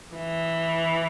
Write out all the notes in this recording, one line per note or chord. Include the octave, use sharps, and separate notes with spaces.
E3